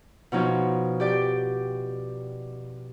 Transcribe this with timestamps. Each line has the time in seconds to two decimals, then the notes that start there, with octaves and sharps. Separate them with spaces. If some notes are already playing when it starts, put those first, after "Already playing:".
0.32 B2 F3 D#4 C#5
1.00 G4 D5 G5